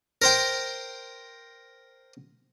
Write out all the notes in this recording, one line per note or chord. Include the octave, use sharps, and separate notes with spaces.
A#4 C5 G5